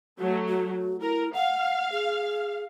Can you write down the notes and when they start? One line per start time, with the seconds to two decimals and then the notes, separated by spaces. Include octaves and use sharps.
0.18 F#3 A3 F#4
0.49 F#4
1.01 E4 A#4
1.34 F5 F#5
1.92 G#4